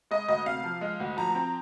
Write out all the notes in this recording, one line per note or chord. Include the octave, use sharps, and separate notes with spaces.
G#3 D#5
D2 D#5
C3 F5
F3
G#3
D2
F3 A#5
C4